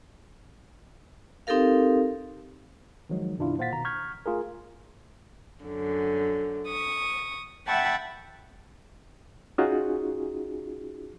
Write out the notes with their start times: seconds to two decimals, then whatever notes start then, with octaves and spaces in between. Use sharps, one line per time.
1.47 C4 D#4 G4 A4 A#4 F5
3.09 D#3 F3 F#3 G#3 D#4
3.38 F#2 B2 D#3 D4 E4 F4
3.58 A#2 C5 F5 F#5 A6 B6
3.72 B2 D#3 A#5
3.85 C#6 F6 G6 G#6 B6
4.26 A3 F4 G#4 A#4
5.63 F#2 D3
6.68 C#6 D#6
7.66 E5 F#5 G5 A5 B5 C#6
9.58 C#4 D#4 F4 F#4 G#4